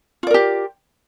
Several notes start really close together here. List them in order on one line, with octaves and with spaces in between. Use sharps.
F4 D5 A#4 G4